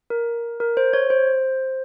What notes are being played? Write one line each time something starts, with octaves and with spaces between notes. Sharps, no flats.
A#4
A#4
C5
C#5
C5